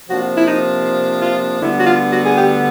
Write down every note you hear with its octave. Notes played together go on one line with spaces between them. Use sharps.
C3 F3 A#3 D4 F#4
E4
D#4
F4
D2 D3 G3 B3 E4
F#4
F4
F#4
G#4
G4